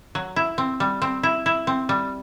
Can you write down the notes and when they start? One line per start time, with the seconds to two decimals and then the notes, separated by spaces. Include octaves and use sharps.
0.15 F#3
0.36 E4
0.58 C4
0.80 G3
1.02 C4
1.23 E4
1.46 E4
1.67 C4
1.89 G3